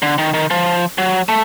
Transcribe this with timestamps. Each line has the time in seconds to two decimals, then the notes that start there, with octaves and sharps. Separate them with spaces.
0.02 D3
0.18 D#3
0.34 D#3
0.51 F3
0.98 F#3
1.29 A3